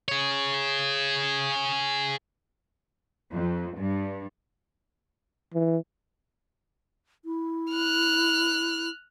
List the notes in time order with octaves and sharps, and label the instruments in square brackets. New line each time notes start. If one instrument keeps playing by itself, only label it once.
[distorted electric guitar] G#4 C#5
[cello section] F2
G2
[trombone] E3
[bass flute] E4
[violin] F6 F#6